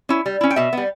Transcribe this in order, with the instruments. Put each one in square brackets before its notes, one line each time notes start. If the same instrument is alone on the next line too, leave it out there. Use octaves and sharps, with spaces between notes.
[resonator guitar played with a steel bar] C#4 E4
G3
C#4 E4
G5
B2 E5
G3 B3